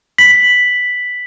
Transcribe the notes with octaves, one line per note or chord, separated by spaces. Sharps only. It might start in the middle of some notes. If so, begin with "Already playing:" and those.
B6 F#7